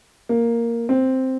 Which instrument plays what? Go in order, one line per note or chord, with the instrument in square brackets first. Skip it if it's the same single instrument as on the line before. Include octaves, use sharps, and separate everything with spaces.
[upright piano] A#3
C4